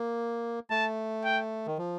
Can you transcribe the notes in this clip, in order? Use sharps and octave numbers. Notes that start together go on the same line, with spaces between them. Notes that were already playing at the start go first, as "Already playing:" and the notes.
Already playing: A#3
A3 A5
G5
D#3
F3